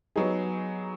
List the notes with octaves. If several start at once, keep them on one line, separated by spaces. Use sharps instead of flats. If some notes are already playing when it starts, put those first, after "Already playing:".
F#3 B3 D#4 G#4